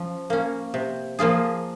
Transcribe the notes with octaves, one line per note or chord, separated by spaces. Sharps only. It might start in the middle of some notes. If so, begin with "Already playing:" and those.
Already playing: F3 C#4
A#3 C#4
C3
F3 A#3 F4 G#4